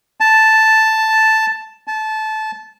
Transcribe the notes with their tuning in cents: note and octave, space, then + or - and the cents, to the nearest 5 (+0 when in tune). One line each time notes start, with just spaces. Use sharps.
A5 +0
A5 -20